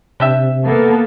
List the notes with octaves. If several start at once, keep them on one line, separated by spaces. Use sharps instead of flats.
C3 D4 G4 E5
A#3 B3 A4